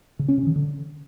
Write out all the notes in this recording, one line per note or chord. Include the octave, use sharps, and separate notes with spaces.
C#3
C#4
C3
D#3
D3